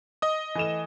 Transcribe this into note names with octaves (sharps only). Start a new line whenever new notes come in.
D#5 D#6
E3 A3 E7